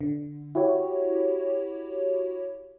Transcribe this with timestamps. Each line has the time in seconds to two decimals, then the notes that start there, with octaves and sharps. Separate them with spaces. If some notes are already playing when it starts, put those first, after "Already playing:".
0.01 D3
0.55 E4 F#4 G4 C#5